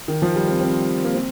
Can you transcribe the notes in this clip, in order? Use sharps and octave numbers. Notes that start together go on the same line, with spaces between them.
D#3
F3
G3
C4
C4
A#3
C4